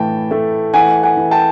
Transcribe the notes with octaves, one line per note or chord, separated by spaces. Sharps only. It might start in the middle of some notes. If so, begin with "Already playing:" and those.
Already playing: A2 E3 G5 A5
A3
E3 F#5 G#5
F#5 G#5
E3
G5 A5